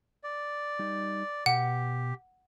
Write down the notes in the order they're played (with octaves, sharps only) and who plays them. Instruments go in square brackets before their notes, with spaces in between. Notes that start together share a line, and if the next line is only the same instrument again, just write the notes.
[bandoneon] D5
[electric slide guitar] G3 D#4 D#5
[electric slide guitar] B2 [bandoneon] G4 [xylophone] F#5